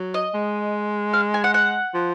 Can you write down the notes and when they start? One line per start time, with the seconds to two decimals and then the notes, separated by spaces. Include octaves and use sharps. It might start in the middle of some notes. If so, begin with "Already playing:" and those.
Already playing: F#3
0.14 D#5
0.34 G#3
1.13 F5
1.34 G#5
1.44 F#5
1.54 F#5
1.94 F3